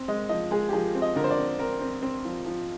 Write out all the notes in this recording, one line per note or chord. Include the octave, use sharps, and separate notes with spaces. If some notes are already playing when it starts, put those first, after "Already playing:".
Already playing: C4
G#3 D#5
F3 D#5
G#3 G#4
G4
F3 G#4
C4
D#5
D3 A#4
C5
D5
C4
C4 A#4
C4
C4
F3
F3